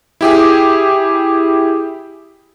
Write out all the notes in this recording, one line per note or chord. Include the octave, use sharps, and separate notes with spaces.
E4 G4 G#4